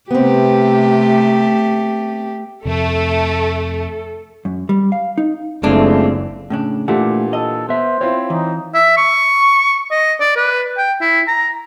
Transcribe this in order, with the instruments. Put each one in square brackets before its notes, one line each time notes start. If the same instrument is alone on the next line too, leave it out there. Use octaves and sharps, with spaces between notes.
[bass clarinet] C3 [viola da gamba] A3 G4 [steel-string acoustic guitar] B3 C4
[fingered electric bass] F2 C3 [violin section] A3 [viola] A4
[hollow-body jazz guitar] F#2
G3
F5
D#4
[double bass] F#1 [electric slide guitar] G#3 C4 F4 [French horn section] A3 [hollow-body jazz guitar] D4
[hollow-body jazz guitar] A2 C#3 D4
[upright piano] A#2 E3 D4 [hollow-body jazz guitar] A3 [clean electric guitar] G4 F#5
[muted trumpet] A4 [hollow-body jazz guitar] D#5
[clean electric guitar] B3 E5 [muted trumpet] C5
[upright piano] C4 E4 F4 [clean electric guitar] C#5
[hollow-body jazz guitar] E3 [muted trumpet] D#4
[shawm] E5
C#6
D#5
D5
B4
G5
E4
A#5